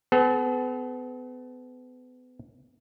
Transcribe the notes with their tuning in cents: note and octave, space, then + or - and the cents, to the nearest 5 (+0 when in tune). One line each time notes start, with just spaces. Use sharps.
B3 +35 A4 -45